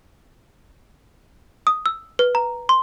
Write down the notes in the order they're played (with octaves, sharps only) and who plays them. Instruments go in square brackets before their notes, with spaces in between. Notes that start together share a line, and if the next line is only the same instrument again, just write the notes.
[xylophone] D#6
E6
B4
A#5
C6